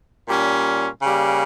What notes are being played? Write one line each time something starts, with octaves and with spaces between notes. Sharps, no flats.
A#2 G3 C#4
C#3 G3 A#3